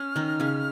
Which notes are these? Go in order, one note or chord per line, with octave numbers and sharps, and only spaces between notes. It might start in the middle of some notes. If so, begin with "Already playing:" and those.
Already playing: C#4 F6
D#3 D#4
C#3 C#4